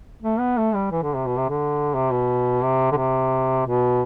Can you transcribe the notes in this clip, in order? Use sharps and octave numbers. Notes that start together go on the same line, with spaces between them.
A3
B3
A3
G3
E3
D3
C3
B2
C3
D3
C3
B2
C3
D3
C3
B2